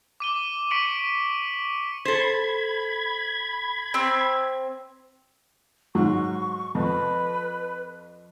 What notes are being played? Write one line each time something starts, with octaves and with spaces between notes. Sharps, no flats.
D6 D#7 G7
C#6 B6 C#7 D7 F#7
A4 C5 B5 G#6
C4
G#2 F#3 C#6
F2 B4